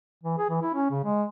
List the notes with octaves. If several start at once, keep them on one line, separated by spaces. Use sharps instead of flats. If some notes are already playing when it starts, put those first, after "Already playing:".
E3
G#4
E3
E4
C#4
C#3
G#3